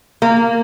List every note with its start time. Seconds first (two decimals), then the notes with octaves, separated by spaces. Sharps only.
0.22 A#3